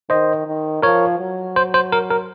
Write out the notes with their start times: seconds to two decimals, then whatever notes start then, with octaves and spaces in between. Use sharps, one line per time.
0.10 D#3 C5 D#5
0.47 D#3
0.82 F3 A#4 C#5
1.19 F#3
1.56 C5
1.74 C5
1.92 A#4
2.10 A#4